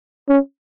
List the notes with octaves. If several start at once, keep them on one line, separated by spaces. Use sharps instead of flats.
C#4